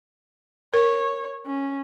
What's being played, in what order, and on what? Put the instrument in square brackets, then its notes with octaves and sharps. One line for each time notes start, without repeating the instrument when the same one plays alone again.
[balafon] A#4 [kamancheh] C#5
[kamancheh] C#4